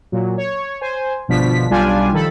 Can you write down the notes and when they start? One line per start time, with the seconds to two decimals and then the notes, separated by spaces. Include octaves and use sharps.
0.12 A#2 F#3
0.38 C#5
0.81 C5 G#5
1.28 G1 B2 F3 D4 B6
1.70 B1 G3 D4 F4 G4 G#5
2.13 D#3 F3 A4 B5